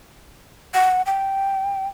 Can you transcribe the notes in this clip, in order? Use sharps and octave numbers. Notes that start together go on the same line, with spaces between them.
F#5
G5